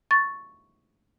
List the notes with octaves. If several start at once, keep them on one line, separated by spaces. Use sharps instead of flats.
C#6 A6